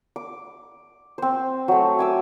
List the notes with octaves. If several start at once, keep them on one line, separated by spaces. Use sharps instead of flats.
D6
C4 C5
F#3 A3
G#5 D6 E6